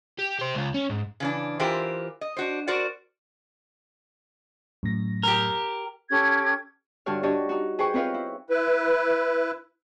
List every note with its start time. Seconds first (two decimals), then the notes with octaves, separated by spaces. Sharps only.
0.19 G4
0.39 G4 C5
0.55 C#2 F4
0.74 C#4
0.90 G#2
1.20 C#3 E3 D4
1.59 E3 F4 G4 A#4 C5
2.21 D#5
2.37 D4 F#4 C5
2.67 F#4 A#4 C5 D5 F#5
4.83 F#2 A2 A#6
5.23 G4 A#4
6.10 C#4 G4 A4 G#6
7.06 G2 D3 F#4 G4 C#5 F6
7.23 D4 F#4 G4 C#5 D#5
7.49 D#4 F#4
7.79 G#4 B4 C5 G5 G#5 C#6
7.94 C4 F4 B4 C#5 D#5 F5
8.14 E4
8.50 E4 B4